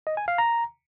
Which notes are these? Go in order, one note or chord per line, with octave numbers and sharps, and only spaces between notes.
D#5
G#5
F5
A#5